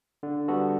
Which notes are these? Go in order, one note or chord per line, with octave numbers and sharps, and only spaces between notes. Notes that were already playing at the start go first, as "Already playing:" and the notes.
D3
G3 B3 F#4 A4